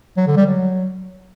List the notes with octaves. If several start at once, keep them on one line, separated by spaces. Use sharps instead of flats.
F#3
D3
G3
F#3